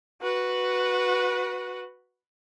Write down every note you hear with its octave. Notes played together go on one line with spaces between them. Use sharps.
F#4 B4